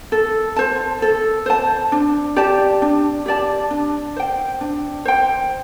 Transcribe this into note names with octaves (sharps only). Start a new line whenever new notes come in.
A4
C5 A5
A4
C5 A5
D4
G4 D5 A5
D4
G4 D5 A5
D4
C5 G5
D4
C5 G5